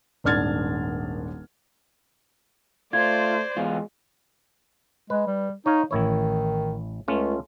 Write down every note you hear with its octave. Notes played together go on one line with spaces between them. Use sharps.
D#1 G#1 D4 F6 G#6 A6
A3 F4 C5 D5 G#6
E2 G#3 B3 F4
G#3 B4
G3
D#4 C#5 F5
A1 D#3 E4 C#5
C#2 A3 C#4 F4